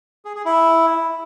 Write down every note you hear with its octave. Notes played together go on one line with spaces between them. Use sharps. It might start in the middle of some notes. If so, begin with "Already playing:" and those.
G#4
G#4
E4